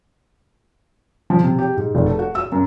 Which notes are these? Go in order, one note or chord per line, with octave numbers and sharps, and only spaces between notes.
F3
C3
G4
G#2
F1
A4
F#4
E6
F#2